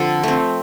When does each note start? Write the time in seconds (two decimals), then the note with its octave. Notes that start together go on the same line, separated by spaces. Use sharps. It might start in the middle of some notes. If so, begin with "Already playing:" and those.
Already playing: D3 F3 C4 A4
0.23 A3 C4